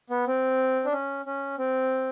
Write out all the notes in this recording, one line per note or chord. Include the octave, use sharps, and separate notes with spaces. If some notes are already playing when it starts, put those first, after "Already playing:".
B3
C4
D4
C#4
C#4
C4